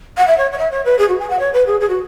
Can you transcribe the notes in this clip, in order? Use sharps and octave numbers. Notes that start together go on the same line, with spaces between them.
F#5
E5
C#5
C#5
E5
C#5
B4
G#4
F#4
G#5
F#5
C#5
B4
G#4
G#4
F#4